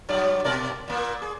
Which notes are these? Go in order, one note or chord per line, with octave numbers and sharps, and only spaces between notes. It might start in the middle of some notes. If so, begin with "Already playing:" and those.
G2 F#3 D5
B2 A#4 D5
A#2 A#3
G#4